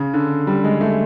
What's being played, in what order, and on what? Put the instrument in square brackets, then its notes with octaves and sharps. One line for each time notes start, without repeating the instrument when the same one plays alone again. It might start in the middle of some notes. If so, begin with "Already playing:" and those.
Already playing: [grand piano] C#3
D3
G3
G#3
A3